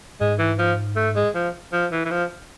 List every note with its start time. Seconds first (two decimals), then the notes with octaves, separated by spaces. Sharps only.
0.21 G#2 G#3
0.39 E3
0.59 F3
0.96 A3
1.16 G#3
1.35 F3
1.73 F3
1.91 E3
2.05 E3
2.11 F3